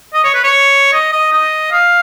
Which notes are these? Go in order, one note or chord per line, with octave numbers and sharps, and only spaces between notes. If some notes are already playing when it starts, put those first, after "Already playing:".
D#5
C#5
B4
C#5
D#5
D#5
D#5
F5